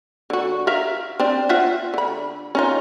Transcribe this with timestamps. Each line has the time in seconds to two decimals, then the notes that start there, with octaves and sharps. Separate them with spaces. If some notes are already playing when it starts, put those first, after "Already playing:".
0.30 D3 F#4
0.67 A#4 E5 F5
1.20 C4 D4
1.49 F4 E5 F#5
1.94 D3 B5
2.55 C#4 D#4 F4